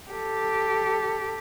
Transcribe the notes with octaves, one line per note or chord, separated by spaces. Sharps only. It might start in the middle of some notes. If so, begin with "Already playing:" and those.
G4 A4